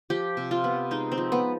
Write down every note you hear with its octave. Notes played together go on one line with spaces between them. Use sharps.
F3 G4
C3
F4
B3
G#3 D#4
C4
F3
B3